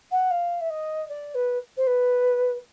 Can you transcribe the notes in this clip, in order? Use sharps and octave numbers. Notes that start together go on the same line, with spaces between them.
F#5
F5
E5
D#5
D5
B4
C5
B4